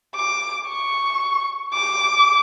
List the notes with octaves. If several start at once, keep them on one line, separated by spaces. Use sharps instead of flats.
D6
C#6
D6